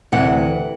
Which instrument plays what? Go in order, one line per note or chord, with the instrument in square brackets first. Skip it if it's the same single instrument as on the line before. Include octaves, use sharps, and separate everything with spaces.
[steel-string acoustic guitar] D2 C3 E3 F#5